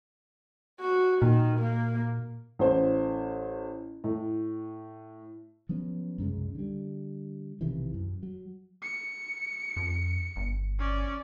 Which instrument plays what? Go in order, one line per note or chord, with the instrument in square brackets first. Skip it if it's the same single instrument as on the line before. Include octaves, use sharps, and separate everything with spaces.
[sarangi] F#4
[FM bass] A#2 [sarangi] D#3
[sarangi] A#3
[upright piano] A1 C5
A2
[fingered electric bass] F3 F#3 B3 C#4
C2 F#2 C#3 G#3
D3 G3
B1 C3 D#3 E3
F#2
F#3
[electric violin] C#7
[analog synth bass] F2
G1
[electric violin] C#4 D5